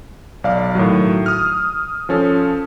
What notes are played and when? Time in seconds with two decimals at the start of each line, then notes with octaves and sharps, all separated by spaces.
0.44 B1 D5 F5
0.75 A2 D#3 F#3
1.26 D#6 F6
2.09 F3 C#4 A4